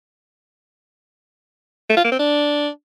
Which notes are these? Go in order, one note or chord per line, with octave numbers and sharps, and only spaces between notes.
A3
F4
A#3
C4
D4